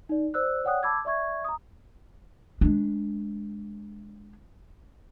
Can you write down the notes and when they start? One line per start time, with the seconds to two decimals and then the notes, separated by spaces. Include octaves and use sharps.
0.09 D#4 D5
0.34 C5 D5 E6 F#6
0.64 C#5 D5 F#5 G5 D#6 F#6
0.83 A5 B5 D6 E6 G#6
1.05 D5 E5 C#6 G#6
1.44 A#5 D#6
2.61 G#3 D4